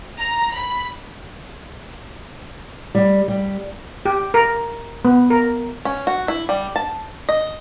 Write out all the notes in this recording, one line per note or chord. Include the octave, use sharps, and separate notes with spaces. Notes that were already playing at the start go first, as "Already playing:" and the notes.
A#5
B5
G3
G3
G4
A#4
B3
A#4
C#4
F#4
E4
G3
A5
D#5